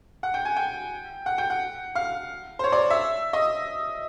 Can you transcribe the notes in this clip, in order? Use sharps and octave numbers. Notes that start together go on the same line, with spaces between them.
F#5
G5
G#5
G5
F#5
G5
F#5
F5
C5
C#5
D5
E5
D#5